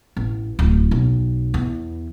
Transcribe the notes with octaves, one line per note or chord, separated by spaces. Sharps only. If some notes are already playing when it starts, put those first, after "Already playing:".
A1
D1
B1
E2